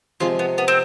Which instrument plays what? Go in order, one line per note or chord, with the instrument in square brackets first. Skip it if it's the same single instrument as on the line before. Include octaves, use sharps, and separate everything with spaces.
[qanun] C3 F3 G#3 [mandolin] F4
[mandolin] B3
B3
C4